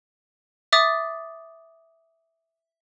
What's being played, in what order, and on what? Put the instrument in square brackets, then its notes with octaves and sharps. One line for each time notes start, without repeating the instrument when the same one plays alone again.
[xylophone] E5 D6 D#6 A6